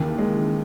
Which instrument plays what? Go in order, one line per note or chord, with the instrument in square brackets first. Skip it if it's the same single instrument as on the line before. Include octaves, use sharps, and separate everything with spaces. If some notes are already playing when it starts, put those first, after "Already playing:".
Already playing: [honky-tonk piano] D#2 C#3 E3 [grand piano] A#3
[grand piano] G#3